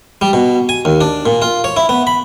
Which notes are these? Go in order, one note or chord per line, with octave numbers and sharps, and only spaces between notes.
G3
B2
G#5
D#2
D4
A#2
F4
C#5
E4
B3
B5